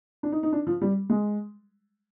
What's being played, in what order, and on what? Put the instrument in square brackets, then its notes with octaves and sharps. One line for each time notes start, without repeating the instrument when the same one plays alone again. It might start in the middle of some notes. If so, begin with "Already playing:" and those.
[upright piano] D4
D#4
D#4
D4
F3
G3
G#3